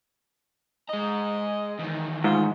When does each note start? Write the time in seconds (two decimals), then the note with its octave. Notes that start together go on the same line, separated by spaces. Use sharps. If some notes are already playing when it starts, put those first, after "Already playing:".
0.89 G#3 D#5 A#5
1.79 E2 D#3
2.24 G#2 F4